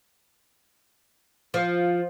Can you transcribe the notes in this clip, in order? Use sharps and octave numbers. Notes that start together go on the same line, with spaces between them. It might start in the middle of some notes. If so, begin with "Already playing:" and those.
F3